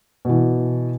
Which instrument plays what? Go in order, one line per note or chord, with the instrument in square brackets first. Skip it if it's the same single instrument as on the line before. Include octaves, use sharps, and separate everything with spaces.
[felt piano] B2 E3